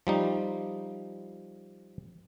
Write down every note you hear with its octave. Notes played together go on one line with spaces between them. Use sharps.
F3 G3 D#4